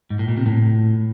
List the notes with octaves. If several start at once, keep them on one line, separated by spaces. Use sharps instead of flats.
G#2
A2
A#2
C3
A2